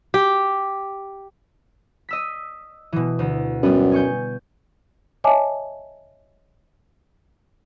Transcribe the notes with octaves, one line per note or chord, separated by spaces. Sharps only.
G4
D#5 E6 B6
B2 E3
D2
F#2 G3 B3
G#5 C#6 G6
C#5 D#5 E5 G#5 A5 D6